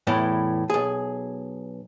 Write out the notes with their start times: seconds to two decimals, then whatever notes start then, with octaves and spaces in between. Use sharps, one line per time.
0.07 E2 A2 E3
0.70 B1 G#4